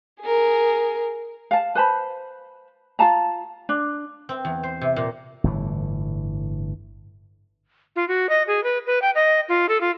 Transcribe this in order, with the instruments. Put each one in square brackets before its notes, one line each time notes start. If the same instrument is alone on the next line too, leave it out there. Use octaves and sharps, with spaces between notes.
[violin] G#4 A#4
[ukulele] F5 A5
B4 C5 A5 B5
F4 F5 A5 A#5
D4
[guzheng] C4
E2
C5
C3
A#2
[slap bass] G1 A2 E3
[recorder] F4
F#4
D#5
G#4
B4
B4
G5
D#5
F4
A4
F4